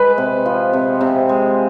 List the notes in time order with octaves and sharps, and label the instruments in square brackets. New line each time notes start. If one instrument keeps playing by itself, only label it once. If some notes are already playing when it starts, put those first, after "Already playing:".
Already playing: [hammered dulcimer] G#3 [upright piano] B4
[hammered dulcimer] C3
F3
C3
C3
G#3